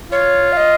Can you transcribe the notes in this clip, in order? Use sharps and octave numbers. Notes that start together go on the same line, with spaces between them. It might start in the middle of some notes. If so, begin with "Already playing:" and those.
F4 C#5
F5
D#5